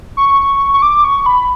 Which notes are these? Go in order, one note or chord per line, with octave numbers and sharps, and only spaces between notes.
C#6
C#6
D6
C#6
B5